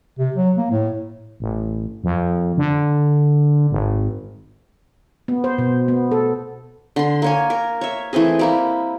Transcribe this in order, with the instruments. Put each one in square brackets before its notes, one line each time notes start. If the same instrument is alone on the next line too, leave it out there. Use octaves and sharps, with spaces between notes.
[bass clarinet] C3
F#3
A#3
A2
[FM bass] A1
F2
D3
G#1
[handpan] B3
C5
B2
B3
A4
[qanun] D3 C6
A#3 C#5 G#5
A#4
C#5 E5
E3 A3 C4 G#4
G3 A#3 E4